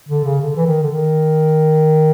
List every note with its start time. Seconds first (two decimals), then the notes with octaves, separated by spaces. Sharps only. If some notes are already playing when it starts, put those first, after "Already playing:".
0.09 D3
0.25 C#3
0.41 D3
0.56 E3
0.66 D#3
0.83 D3
0.91 D#3